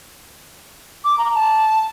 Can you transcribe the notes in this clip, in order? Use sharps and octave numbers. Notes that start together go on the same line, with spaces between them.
D6
A#5
A5